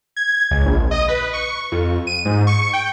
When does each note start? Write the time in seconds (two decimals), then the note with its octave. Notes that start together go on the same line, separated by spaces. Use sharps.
0.17 G#6
0.51 C#2
0.65 A#1
0.91 D#5
1.08 B4
1.33 C#6
1.72 F2
2.07 D#7
2.25 G#2
2.47 C#6
2.73 G5